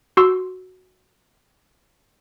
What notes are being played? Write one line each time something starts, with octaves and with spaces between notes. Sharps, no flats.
F#4 C6 E6